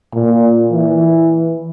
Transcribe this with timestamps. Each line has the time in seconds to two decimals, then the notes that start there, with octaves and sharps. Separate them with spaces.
0.14 A#2
0.71 E3